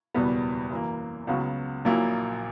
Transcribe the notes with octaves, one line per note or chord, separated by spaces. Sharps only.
F#1 E2 B2 G3 B3
F#2 E3 A#3
C#2 C#3 F#3 B3 F#4
A#1 A#2 F#3 A#3 E4